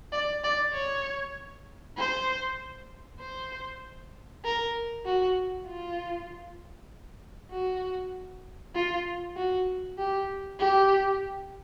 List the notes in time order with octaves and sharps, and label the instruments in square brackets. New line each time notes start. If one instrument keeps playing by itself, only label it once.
[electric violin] D5
D5
C#5
C5
C5
A#4
F#4
F4
F#4
F4
F#4
G4
G4